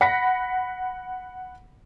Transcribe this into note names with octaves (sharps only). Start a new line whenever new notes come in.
F#5 B5 A#6 B6 C#7